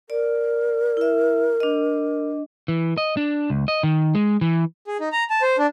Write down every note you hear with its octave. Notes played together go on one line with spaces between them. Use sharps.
A#4 D5
E4 E5
D4 D#5
E3
D#5
D4
C#2
D#5
D#3
G#3
E3
G#4
D#4
A#5
A5
C5
D4